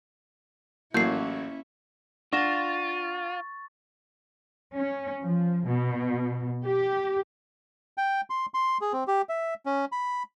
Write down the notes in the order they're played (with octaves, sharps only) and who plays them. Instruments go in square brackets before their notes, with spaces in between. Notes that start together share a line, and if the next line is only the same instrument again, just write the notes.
[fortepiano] A1 F#3 [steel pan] A#3 [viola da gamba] C#4 E4 [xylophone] G6 C7
[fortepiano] D4 [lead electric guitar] F4 [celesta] F#5 A#6 E7 [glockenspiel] C#6 A6
[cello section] C#4
F3
B2
G4
[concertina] G5
C6
C6
G#4
C4
G4
E5
C#4
B5